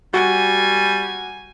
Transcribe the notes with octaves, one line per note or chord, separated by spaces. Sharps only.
G3 F#4 G#5